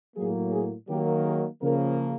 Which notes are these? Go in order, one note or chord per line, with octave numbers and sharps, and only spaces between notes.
A2 F#3 A#3 G#4
G#4
D#3 F#3 A#3 G4
G#4
C#3 F3 A#3 A#4